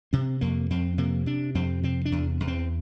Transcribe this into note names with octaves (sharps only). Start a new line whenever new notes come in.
C3 C4
F2 A#3
F2 C4
C3 A#3
C3 D4
F2 C4
C3 C4
D4
E2
E2
C4